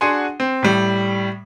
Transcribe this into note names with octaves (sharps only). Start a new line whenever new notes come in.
D4 F#4 G#4 F#5 G#5 C6
C4
A2 G3